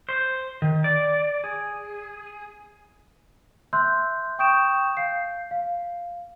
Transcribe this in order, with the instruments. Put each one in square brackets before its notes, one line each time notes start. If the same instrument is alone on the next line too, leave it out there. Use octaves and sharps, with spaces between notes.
[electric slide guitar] C5
D#3
D5
G#4
[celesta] E5 C6 E6 F#6 G6
G5 C#6 D#6 G6 D7 E7
F5 G6 C7
F5